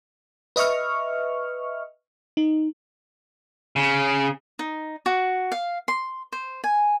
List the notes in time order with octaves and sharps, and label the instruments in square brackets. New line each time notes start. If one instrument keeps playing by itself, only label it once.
[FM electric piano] B4 D#5 E5 C#6 F6
D#4
[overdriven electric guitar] C#3
[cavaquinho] D#4
F#4
F5
C6
C5
G#5